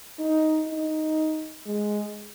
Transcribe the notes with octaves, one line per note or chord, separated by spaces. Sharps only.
D#4
D#4
G#3